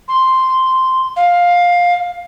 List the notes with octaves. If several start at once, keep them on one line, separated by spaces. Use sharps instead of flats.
C6
F5